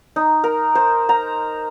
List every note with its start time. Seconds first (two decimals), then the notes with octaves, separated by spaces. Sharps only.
0.16 D#4
0.44 A#4
0.75 C5
1.09 A#5